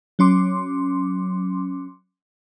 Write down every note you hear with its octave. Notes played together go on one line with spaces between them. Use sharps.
F#3 C#4 C6 D6